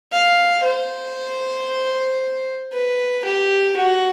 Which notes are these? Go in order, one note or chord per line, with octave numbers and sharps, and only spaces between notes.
F5
C5
B4
G4
F#4